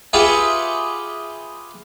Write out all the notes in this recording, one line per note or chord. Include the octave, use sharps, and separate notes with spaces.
F4 G4 G#4 B4 E5 F#5